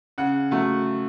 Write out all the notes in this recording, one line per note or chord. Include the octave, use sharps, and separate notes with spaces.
C#3 F#5
F#3 A3 F#5